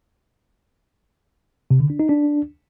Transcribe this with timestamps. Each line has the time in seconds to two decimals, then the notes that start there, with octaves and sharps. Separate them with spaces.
1.71 C3
1.80 D3
1.90 D4
2.00 D#4
2.09 D4